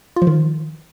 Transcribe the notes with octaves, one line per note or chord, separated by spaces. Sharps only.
F4
F3
D#3